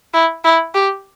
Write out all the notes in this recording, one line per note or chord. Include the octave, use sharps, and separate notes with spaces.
E4
E4
G4